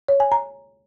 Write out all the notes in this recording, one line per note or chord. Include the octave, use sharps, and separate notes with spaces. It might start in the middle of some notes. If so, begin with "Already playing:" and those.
C#5
G#5
A#5